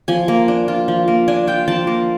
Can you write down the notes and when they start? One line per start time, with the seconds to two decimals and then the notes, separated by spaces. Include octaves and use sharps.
0.08 F3 G#5
0.28 A#3
0.48 D4
0.68 F4
0.88 F3
1.08 A#3
1.28 D4 G#5
1.47 F4 G5
1.68 F3 A5
1.87 A#3